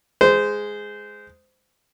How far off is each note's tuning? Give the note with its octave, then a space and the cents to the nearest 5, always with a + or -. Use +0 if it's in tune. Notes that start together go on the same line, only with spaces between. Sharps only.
G#3 +0 C5 -20